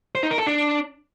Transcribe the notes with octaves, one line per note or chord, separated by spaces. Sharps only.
C5
D#4
A#4
A4
D4